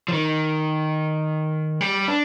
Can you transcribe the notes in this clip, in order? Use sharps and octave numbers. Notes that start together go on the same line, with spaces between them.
F3
D#3
G3
D4